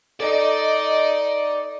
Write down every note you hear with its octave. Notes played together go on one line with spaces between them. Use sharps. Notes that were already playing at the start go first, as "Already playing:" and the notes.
D#4 A4 D5 D#5